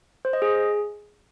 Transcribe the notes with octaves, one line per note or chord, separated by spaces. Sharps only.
C5
D#5
G#4